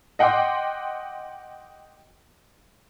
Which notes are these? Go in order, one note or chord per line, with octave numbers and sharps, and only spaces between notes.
D#5 F#5 G5 C6 D6